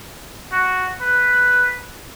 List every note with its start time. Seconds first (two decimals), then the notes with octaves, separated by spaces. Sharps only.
0.52 F#4
1.01 B4